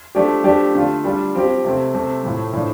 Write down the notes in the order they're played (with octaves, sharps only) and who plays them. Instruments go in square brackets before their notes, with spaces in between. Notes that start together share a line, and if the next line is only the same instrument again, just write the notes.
[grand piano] F3 A3 D4 G4
F3 A3 D4 G4
D3 A3 F4
G3 D4 F4
F3 C4 G4
C3 A3 C4
C3 A3 C4
A2 F3 A3
A2 F3 D4